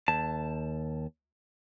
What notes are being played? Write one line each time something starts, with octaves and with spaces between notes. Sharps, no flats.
D#2 A5